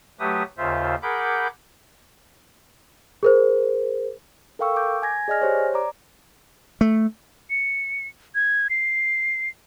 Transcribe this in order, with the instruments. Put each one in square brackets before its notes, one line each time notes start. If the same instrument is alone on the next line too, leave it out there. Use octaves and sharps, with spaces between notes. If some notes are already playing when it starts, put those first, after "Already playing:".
[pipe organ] F#3 A3 G4 B4 E5 D#6
D#2 C#3 F4 C5 E5
G#4 A#4 F#5 B5 D6 G6
[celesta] G#4 A#4 C5
[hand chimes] A4 A#4 F5 G5 C#6 E6
D6 G6
G#5 G#6 A#6
G#4 D5 D#5 G#5 F6 A#6
G4 C5 C#5
D5 A#5 D6
[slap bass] A3
[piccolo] C#7
G#6
C7